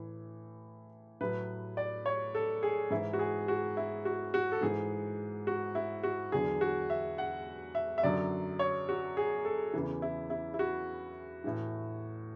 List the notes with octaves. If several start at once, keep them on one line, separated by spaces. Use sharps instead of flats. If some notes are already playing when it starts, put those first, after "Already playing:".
Already playing: A2 E3
A2 F#3 B4
D5
C#5
A4
G#4
G#2 E3 E4
F#4
G#4
F#4
E4
F#4
F#4
A4
G#2 E3 G#4
F#4
E4
F#4
E2 D3 F#3 G#4
F#4
E5
F#5
E5
E5
F#2 D3 F#3 D5
C#5
F#4
G#4
A4
E2 C#3 E3
E4
E4
E4
F#4
A2 E3